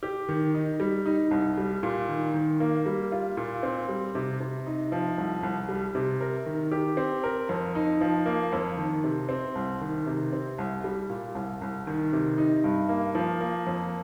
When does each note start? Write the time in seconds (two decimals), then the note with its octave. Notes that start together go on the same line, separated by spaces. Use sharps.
0.03 G4
0.29 D#3
0.54 D#4
0.80 G3
1.06 D#4
1.31 C2
1.58 G3
1.83 A#2
2.09 D#3
2.34 D#3
2.60 A#3
2.86 G3
3.12 F4
3.37 A#2
3.63 C4
3.89 G3
4.15 C3
4.40 C3
4.66 D#4
4.92 F3
5.18 C2
5.43 C2
5.69 G3
5.95 C3
6.21 A#4
6.46 D#3
6.72 G4
6.97 C4
7.24 A#4
7.49 F2
7.75 D#4
8.01 F3
8.26 A#3
8.53 F2
8.77 D#3
9.04 C3
9.29 C4
9.55 C2
9.81 D#3
10.07 C3
10.33 C4
10.58 C2
10.84 G3
11.10 A#2
11.35 C2
11.61 C2
11.87 D#3
12.13 C3
12.38 D#4
12.64 G2
12.89 A#3
13.15 F3
13.41 A#3
13.67 F2